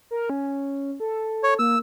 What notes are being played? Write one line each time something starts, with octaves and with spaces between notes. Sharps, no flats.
A#4
C#4
A4
C#5
A#3 E6